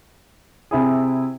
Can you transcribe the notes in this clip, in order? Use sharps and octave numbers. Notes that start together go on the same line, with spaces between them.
C3 E4 G#4